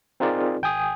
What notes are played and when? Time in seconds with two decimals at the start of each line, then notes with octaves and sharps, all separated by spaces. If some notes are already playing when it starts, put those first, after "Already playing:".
0.20 C4 D#4 F4 G#4 A#4 D5
0.62 G#1 G5 G#5 D#6